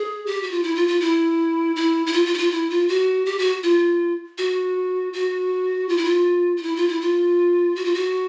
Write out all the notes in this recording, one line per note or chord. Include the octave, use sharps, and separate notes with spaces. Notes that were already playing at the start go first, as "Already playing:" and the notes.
Already playing: G#4
G4
F#4
F4
E4
F4
F4
E4
E4
E4
F4
F4
E4
F4
E4
F4
F#4
G4
F#4
F4
F#4
F#4
F4
E4
F4
F4
E4
F4
E4
F4
F#4
F4
F#4